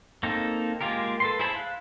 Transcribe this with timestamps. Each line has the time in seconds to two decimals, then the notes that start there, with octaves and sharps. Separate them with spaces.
0.23 A#3 C4 D#4 A4
0.81 G#3 A#3 F4 G4 A#4
1.20 A4 B4 C6
1.39 E4 G#4 C5 A5 B5
1.55 F5 F#6